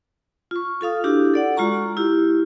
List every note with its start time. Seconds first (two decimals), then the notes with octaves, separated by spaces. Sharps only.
0.51 F4 C#6
0.81 F4 A4 F5 D#6
1.04 D4 E4 F#4 G4
1.34 A4 D5 F#5
1.57 G#3 F4 F#4 A#5 C#6
1.97 E4 F4 G4